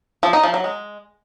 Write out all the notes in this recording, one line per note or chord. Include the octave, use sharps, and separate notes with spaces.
F3
D#4
F3
F#3
G#3